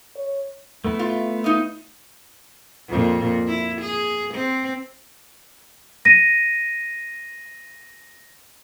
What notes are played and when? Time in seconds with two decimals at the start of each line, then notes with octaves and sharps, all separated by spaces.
0.15 C#5
0.84 A3 B3 E4
0.99 F4
1.44 D#4 F4 D#5
2.89 F2 A#2
3.47 E4
3.82 G#4
4.34 C4
6.05 A#6 D#7